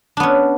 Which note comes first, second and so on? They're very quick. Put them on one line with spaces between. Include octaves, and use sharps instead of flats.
D4 B3 C#4